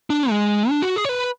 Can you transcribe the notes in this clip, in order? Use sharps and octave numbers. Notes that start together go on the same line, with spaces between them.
D4
G#3
D4
F#4
G#4
C#5
B4